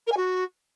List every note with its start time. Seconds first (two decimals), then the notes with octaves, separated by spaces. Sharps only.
0.06 A#4
0.11 G#5
0.17 F#4